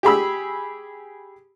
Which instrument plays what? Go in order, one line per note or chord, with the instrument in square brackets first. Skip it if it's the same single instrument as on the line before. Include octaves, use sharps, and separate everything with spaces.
[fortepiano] G4 G#4 B5 E6